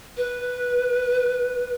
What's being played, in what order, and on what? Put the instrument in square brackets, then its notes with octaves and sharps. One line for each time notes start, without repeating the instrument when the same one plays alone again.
[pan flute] B4